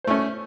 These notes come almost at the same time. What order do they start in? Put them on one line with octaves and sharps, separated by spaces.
C5 A3 C#4